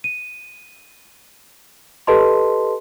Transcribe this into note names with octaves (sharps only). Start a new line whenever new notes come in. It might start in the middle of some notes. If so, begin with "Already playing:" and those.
D#7
G4 A4 B4 D#5 A5 C6